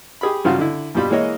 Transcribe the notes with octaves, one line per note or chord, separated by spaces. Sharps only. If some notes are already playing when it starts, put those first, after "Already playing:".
G4 G#4 B5
G2 C#3 F#3 F4 F#4 F5
D3 E4
G2 B2 G3 F4 B5
E3 G#3 A#3 C#5 D#5